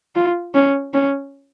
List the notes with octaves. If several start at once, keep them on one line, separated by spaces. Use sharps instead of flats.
F4
C#4
C#4